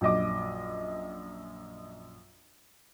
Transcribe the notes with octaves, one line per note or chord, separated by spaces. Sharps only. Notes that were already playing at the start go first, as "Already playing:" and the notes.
A#1 F#2 D#5 D6